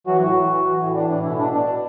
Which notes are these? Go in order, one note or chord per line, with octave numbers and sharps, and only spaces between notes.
E3 F#3 F#4
A2 F#3 F#4
E3
E3
E3
A2
E3 D4
A2 D4
B2 E4
B2 D4
B2 D4
B2